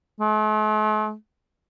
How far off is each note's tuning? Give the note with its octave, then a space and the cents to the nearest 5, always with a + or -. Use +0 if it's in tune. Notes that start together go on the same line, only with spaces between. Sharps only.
A3 -45